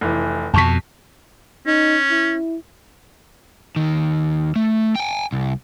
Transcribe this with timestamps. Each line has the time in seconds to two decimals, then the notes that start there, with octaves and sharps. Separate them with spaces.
0.01 F1 E3
0.54 F2 B2 A5 C#6 B6
1.67 C#4 D#4
2.11 E4
3.76 D#2 D#3
4.56 A3
4.96 G5 G#5
5.33 C2